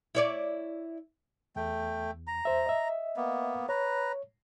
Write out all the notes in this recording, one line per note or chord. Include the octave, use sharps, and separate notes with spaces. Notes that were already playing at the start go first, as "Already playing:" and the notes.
E4 C#5 D5
E2 A3 G5
A#5
E2 C5 E5
D#5 E5
A#3 B3
B4 C#5 A#5